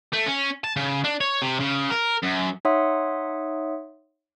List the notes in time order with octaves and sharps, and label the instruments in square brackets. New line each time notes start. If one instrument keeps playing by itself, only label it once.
[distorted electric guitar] A3
C#4
A5
C#3
D4
C#5
C3
C#3
A#4
F#2
[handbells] D#4 C#5 E5 F#5 C6 D#6